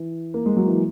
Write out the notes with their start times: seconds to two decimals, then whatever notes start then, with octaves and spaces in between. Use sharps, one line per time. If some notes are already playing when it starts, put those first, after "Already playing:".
Already playing: E3
0.34 A#3
0.46 G#3
0.57 F#3
0.68 E3